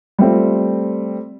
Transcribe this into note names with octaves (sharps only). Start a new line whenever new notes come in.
G3 A3 C4 F4